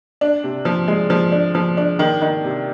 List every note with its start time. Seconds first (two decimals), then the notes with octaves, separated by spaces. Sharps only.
0.21 D4
0.44 C3
0.65 F3
0.88 G#3
1.10 F3
1.32 D4
1.55 F3
1.77 D4
1.99 D#3
2.22 D#3
2.44 C3